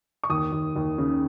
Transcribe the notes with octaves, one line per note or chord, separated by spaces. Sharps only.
C#6
D#2 D#6
D#2
D#2
C#3